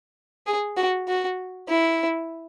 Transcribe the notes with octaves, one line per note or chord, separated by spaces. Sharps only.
G#4
F#4
F#4
E4